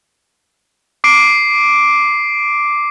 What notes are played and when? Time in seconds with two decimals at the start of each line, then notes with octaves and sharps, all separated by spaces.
1.04 D6 C7 D7